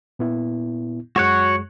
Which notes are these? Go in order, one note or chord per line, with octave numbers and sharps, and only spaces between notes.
A#2 B3 E4
F#2 G#3 F#4 C#5 F#5